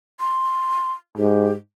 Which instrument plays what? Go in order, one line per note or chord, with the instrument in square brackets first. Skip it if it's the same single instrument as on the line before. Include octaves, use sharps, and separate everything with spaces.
[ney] C6
[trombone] G#2 [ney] G4